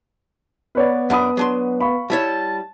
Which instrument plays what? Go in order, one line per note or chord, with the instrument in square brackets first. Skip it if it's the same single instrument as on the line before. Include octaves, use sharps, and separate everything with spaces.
[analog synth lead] B3 [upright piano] B4 C#5 D5
[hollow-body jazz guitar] F#2 D4 [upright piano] F#5 B5 D#6
[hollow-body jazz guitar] F#3 D4 C6
[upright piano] F5 B5 C#6
[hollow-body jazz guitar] G3 E4 C#5 [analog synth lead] A5